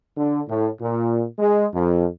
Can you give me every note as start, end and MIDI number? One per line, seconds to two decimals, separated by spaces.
0.17 0.41 50
0.49 0.69 45
0.80 1.25 46
1.39 1.67 56
1.73 2.07 41